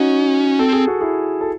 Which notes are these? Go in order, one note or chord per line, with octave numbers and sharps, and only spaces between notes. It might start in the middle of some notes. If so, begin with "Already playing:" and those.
Already playing: C#4 D#4 F#4
C4 A4
G#4
F#4
E4 G#4
A4